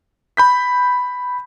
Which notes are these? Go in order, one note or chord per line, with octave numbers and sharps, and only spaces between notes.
B5 G6 B6